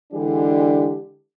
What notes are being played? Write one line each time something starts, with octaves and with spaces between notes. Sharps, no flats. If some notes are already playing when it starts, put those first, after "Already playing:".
D3 E3 G#3 D4 G4